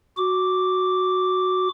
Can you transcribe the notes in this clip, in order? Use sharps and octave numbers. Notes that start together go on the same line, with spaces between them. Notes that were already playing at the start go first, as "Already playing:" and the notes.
F#4 D6